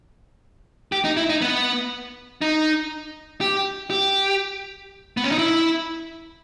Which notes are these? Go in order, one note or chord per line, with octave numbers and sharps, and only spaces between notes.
G4
D#4
E4
D#4
B3
D#4
G4
G4
B3
C#4
D#4
E4